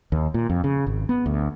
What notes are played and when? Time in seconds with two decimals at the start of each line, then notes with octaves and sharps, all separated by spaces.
0.12 D#2
0.34 A#2
0.50 F2
0.64 C#3
0.87 G#1
1.09 B3
1.26 D2